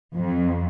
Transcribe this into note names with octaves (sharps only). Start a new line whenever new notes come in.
F2